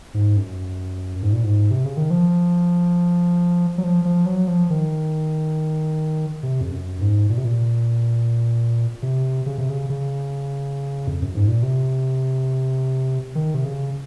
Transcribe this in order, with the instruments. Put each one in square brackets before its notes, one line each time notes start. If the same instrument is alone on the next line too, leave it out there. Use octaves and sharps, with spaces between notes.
[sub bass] G#2
F#2
G#2
A#2
G#2
C3
C#3
D#3
F3
F#3
F3
F3
F#3
F3
D#3
C3
F2
F#2
G#2
A#2
C3
A#2
C3
C#3
C3
C#3
C#3
F2
F#2
G#2
A#2
C3
D#3
C3
C#3